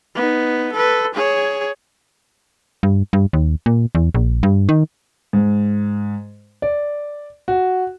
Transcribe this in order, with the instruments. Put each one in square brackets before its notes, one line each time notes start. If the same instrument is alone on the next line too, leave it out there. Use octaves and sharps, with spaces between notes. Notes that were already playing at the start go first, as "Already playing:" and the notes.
[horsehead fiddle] B3 D#4
A4 B4
G#4 C#5
[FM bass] G2
G2
D#2
A#2
E2
A#1
G2
D#3
[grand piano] G#2
D5
F#4